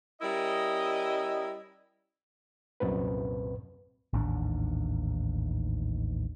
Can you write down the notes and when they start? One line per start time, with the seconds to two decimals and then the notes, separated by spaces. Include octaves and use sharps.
0.22 G3 C#4 E4 A#4 D#5
2.80 C2 F#2 A#2 C4 B4
4.13 A1 D#2 G#2 D4